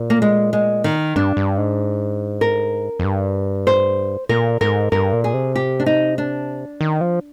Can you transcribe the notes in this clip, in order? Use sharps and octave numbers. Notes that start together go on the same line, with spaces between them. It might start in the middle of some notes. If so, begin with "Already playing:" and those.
Already playing: A#2
A#3
G#3
G#3
D#3
G2 D4
G2
G#2
A#4
F2
G2
C5
A#2 A#4
G#2 A#4
G2 A#4
A#2
G#4
C3
G4
D4
D#4
D4
D#3
F3